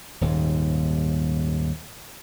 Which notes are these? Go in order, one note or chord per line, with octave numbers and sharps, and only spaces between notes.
D#1 D#2 G#2